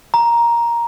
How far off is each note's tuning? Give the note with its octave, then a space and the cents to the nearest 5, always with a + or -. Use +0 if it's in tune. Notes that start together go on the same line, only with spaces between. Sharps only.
A#5 +10